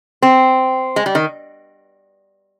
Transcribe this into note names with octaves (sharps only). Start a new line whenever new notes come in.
C4
G#3
G3
D#3